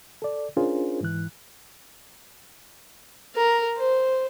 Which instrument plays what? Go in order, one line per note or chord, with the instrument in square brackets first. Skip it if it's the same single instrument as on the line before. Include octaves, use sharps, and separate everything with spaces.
[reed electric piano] A4 D5
C#4 D4 F4 G#4 A#4 C5
G#2 E3 F#6
[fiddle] A#4
C5